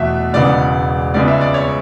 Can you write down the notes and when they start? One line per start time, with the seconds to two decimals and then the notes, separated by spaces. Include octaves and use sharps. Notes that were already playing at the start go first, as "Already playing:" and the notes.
Already playing: E2 B2 A3 E5
0.33 E1 E2 C#3 G#3 B3 D5
1.14 C#2 C#3 G#3 B3 D5
1.28 E5
1.41 D5
1.54 C#5